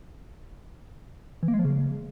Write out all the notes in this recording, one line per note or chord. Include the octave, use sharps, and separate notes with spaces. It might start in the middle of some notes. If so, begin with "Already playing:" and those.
E3
A#3
G#3
F3
C#3